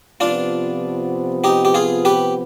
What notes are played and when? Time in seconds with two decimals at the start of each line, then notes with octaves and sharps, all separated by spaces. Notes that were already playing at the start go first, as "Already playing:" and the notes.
0.20 C3 F3 B3 D4 F4
1.44 D#4 G4
1.65 G4
1.74 F4 G#4
2.05 G4 B4